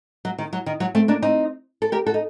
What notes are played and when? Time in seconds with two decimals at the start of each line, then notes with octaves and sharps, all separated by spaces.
0.25 F#3
0.38 D#3
0.53 F#3
0.66 D#3
0.80 F#3
0.95 A3 C4
1.08 A#3 D4
1.22 C4 D#4
1.82 A4
1.92 G4 A#4
2.06 F#4 A4
2.14 D#4